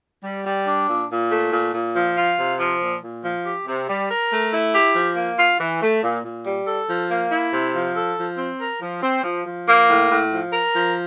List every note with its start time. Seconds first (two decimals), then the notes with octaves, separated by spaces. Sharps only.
0.23 G3
0.45 G3
0.66 D4
0.88 A#2
1.10 A#2
1.30 A3
1.52 A#2
1.73 A#2
1.95 F3
2.16 F4
2.38 C3
2.59 F3
2.81 A#2
3.02 A#2
3.24 F3
3.45 G4
3.67 C3
3.88 G3
4.09 A#4
4.31 A3
4.52 E4
4.73 G4
4.95 F3
5.17 A#3
5.38 F4
5.60 E3
5.82 A3
6.03 A#2
6.23 A#2
6.45 G3
6.66 A4
6.88 F3
7.10 A#3
7.31 E4
7.52 C3
7.74 F3
7.95 A4
8.18 F3
8.38 C4
8.60 A#4
8.82 F3
9.02 C4
9.24 F3
9.46 F3
9.68 A#3
9.89 A2
10.09 A2
10.32 F3
10.52 A#4
10.75 F3